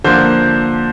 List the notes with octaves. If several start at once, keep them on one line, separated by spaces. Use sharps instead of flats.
D3 F3 A#3 C5